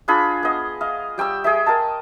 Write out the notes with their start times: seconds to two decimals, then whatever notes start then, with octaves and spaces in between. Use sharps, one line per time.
0.08 D4 F4 G#4 B5
0.43 B3 D#5
0.81 D#5 F5
1.18 G3 G5 C#6 E6
1.44 G#4 D#5 E5
1.66 A#4 D#5 G5 A5